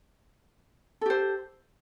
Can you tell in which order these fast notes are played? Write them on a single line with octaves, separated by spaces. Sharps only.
A4 G4 C5